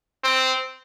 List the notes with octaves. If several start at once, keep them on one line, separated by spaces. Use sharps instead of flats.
C4